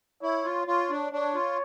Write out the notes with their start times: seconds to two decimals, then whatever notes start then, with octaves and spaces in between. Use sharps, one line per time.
0.22 E4 C#5
0.45 F4
0.67 F4 C#5
0.90 D4
1.12 D4 C#5
1.34 F4